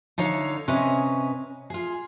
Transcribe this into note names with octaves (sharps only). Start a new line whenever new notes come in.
D3 D#4 C#5 F5
C3 C#4 B4 D#5 G#5
F4 G#4